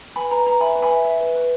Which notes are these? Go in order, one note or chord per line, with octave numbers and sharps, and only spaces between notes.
B4 G#5 B5
B4 A#5
B4 A#5
E5 G#5 B5
B4
G#5 B5
E5
E5
B4
B4